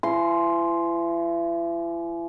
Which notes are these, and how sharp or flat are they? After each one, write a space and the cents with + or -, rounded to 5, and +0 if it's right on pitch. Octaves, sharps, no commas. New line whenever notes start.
E3 +40 C6 +0